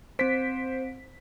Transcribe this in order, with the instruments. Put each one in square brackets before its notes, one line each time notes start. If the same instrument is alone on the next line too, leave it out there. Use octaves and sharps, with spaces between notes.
[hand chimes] C4 D7 [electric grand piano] C5 B6